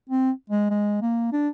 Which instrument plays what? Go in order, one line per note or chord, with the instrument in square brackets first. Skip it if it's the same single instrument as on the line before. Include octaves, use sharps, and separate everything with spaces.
[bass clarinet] C4
G#3
G#3
A#3
D4